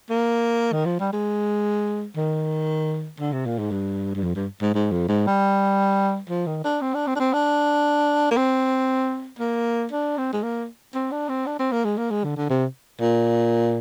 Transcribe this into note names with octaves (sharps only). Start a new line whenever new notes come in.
A#3
D#3
F3
G3
G#3
D#3
D3
C3
A#2
G#2
G2
G2
F2
G2
G#2
G#2
F2
G#2
G3
F3
D#3
D4
C4
D4
C4
D4
C4
D4
A#3
C4
A#3
D4
C4
G#3
A#3
C4
D4
C4
D4
C4
A#3
G#3
A#3
G#3
D3
D3
C3
A#2